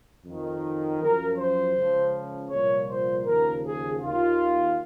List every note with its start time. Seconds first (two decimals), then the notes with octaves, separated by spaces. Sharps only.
0.24 F2 D#3
1.00 F#2 F3 A#4
1.38 C5
1.75 C#2 C#3 F3
2.51 C2 A#2 F3 C#5
2.88 C5
3.25 D#2 C#3 F3 A#4
3.63 G#4
4.00 D#2 D#3 F4